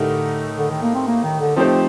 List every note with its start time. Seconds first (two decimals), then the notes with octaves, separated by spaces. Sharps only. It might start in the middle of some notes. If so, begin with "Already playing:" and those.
Already playing: A2 D3 A3 D#4 G4 A#4
0.58 D3
0.70 D#3
0.82 A#3
0.95 C4
1.07 A#3
1.24 D#3
1.40 D3
1.56 F3 A3 C4 D#4 G4 C5